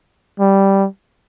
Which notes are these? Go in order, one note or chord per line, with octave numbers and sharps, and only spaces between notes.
G3